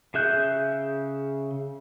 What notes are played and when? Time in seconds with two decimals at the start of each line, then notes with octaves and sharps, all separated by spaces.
0.14 C#3 G#4 E5 F#6 G6